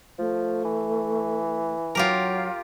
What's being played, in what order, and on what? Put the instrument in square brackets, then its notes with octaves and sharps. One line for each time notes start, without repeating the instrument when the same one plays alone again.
[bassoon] F3 [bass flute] A3
[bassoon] E3
[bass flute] F#3 [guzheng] F4 G4 A#4